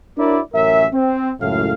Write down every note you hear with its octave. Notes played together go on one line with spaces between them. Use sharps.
D4 E4 F#4 A#4 C#5 D5
A1 F#2 C#4 A#4 E5
C4
C#2 F#2 A2 F5